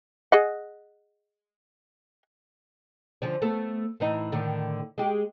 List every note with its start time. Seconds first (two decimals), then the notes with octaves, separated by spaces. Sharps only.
0.32 G#4 D#5 F#5
3.22 D3 F3 C#4
3.42 A3 B3 A4
4.00 A2 E3 D#4
4.32 A2 D3 D#3
4.98 G#3 G4